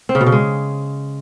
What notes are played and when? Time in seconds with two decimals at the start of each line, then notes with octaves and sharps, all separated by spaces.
0.09 C4
0.15 C#3
0.21 B2
0.26 C#3
0.32 G#3